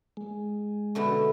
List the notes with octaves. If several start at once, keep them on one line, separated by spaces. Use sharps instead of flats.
G#3
B2 D3 A3